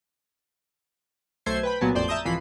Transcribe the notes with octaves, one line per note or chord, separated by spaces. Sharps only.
B1 A3 C5 G#6 C7
B4 G5 B5
C2 A#2 F#3 B3 G#5 A5
A1 F2 C5 D5 G6
E5 A5 A#5 D#6 G6
C2 G#2 E3 F3 B5 C7